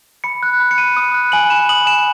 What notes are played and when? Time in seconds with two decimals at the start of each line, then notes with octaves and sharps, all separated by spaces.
0.24 B5 C#7
0.43 F#6
0.60 B5
0.71 C#7
0.78 B5 D#7
0.97 D#6
1.14 F#6
1.32 G#5 F#7
1.50 B5 E7
1.69 D#6 F#7
1.86 G#5 E7